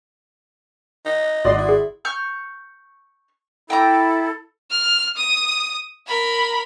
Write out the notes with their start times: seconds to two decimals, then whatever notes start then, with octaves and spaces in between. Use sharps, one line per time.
1.06 D#4
1.44 G#1 F#4 D5 C6 D#6
1.58 E4
1.69 G#4
2.05 C#6 F6 G6
3.70 E4 A4 G5 A#5 D6
4.71 F6
5.17 D#6
6.07 A#4 B5